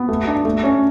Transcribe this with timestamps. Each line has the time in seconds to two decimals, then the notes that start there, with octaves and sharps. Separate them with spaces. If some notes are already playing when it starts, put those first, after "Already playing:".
Already playing: B3
0.08 A3
0.27 D4
0.45 A3
0.64 C#4